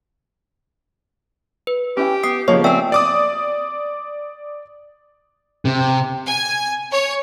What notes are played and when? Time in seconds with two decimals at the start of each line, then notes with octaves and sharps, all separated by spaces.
1.67 B4
1.97 C#4 E4 G4 G5
2.23 B3 D#6 C7
2.48 C#3 F3 A#3 B3 C#5 D#5 C#6
2.64 A3 B3 C4 D5 E5 G#5 E6
2.92 D5 D6 D#6
5.65 C3
6.27 G#5
6.91 C#5